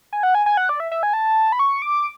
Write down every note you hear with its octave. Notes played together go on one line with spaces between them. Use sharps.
G#5
F#5
G#5
G#5
F#5
D5
E5
E5
G#5
A5
B5
C#6
D6